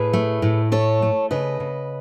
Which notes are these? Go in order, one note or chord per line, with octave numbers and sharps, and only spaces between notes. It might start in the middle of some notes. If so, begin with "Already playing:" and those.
Already playing: A2 G#4 B4
A3
A2
A3 A4 C#5
A3
C#3 B4 D#5
C#3